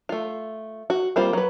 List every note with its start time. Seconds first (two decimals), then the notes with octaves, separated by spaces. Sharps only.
0.09 A3 F4
0.90 F#4
1.16 G3 A#3 C4 F4
1.33 F#3 B4